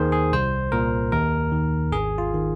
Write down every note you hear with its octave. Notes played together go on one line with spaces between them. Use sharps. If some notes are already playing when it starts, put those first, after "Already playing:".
Already playing: D#2 D#3 G#4 A#4 C5
G#4
C2 C5
A#2 A#4
D#2 A#4
D#3
G#1 G#4
F4
D#3